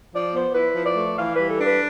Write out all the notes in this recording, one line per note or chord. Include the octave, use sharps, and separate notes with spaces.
F3 D5
B3 C5
E4 B4
F3
D5
A3
E3 F5
B4
G3
A4
D4 B4